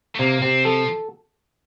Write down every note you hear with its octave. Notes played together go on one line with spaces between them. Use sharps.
A3
C3 A#3
C3 C4
F3 A4